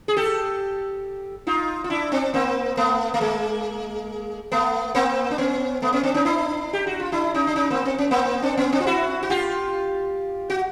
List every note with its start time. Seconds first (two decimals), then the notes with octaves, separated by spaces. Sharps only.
0.08 G#4
0.17 G4 A4
1.47 D#4 F4
1.84 F4
1.90 D4 E4
2.12 C4 D4
2.34 A#3 C4
2.77 A3 B3
3.14 A3
3.21 G#3 A#3
4.52 A3 B3
4.95 A#3 C4
5.31 D4
5.38 B3 C#4
5.82 A3 B3
5.92 B3 C#4
6.03 C4 D4
6.14 C#4 D#4
6.25 D4 E4
6.73 G4
6.87 F#4
7.00 F4
7.12 D4 E4
7.34 C#4 D#4
7.47 D4
7.56 C#4 D#4
7.70 A#3 C4
7.85 C4
7.98 C#4
8.11 A#3 C4
8.42 C4 D4
8.57 B3 C#4
8.73 C4 D4
8.80 F4
8.87 E4 F#4
9.23 F#4
9.30 F4 G4
10.50 F#4